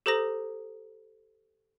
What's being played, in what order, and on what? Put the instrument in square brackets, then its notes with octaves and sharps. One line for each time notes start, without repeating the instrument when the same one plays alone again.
[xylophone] G4 A4 C5 A#5 D#6 A#6